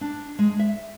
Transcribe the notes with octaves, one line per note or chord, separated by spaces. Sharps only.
D4
G#3
E5